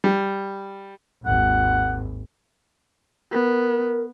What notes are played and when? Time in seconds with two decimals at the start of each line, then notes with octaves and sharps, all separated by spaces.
0.04 G3
1.26 G#1 D#2 F#5
3.32 B3 A#4